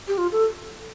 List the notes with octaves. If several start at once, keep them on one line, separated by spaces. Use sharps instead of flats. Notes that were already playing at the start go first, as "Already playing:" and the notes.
G4
F4
A4